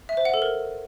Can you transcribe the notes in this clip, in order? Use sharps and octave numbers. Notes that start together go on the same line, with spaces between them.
E5
C5
F#5
A4
A#4